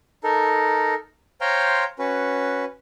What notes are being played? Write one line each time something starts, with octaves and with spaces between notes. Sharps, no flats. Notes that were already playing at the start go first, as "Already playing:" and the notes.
D#4 A4 A#4
C5 C#5 F5 G5 A#5 C6
C#4 F#4 B4